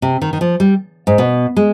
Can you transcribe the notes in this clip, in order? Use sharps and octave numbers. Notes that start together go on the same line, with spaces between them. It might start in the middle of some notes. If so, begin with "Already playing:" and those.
C3
D#3
D#3
F3
G3
G#2
B2
G#3